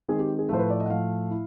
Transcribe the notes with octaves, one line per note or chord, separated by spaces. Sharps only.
D#3 G#3 C4 G#4
G4
G#4
A2 F3 A3 C5
B4
D5
D#5
F#5
A2 F3 A3 F5
E4